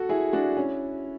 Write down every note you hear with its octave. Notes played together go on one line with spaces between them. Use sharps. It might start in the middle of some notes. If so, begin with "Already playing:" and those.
Already playing: F#4 A4
E4 G#4
D4 F#4
C#4 E4